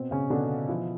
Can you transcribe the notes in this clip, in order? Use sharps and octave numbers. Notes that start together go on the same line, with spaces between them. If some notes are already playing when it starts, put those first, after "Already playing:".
Already playing: B2 C4
C#3 C#4
B2 D3 D4
E3 F3 E4